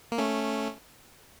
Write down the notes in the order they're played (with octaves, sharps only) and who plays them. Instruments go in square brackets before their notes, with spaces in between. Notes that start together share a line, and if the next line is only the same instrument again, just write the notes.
[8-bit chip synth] A#3
A3 C#4